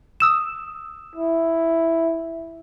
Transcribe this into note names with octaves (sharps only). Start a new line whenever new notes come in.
D#6 E6 E7
E4